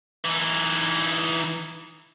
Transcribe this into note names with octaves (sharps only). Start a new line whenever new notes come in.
E3 D#4